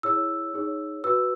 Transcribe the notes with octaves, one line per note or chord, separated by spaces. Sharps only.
E4 G#4 C#5 E6
D#4 G#4 C#5
F#4 B4 E6